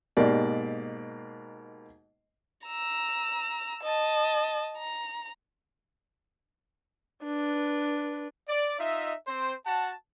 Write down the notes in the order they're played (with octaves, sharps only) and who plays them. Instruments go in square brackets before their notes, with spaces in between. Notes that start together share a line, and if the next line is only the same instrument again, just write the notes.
[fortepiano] G#2 B2 A#3 G4 D5
[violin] A#5 E6
D#5 A5
A#5
[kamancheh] D4 B4
[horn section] D5
D#4 F4 D#5 E5
C4 C5
F#4 F#5 A5